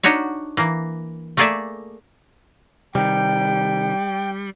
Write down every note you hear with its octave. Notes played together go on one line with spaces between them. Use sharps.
D4 D#4 F#4 C#5 E5
E3 A#3
A3 A#3 G#4 A4 D5 E5
C3 D#3 G3 G5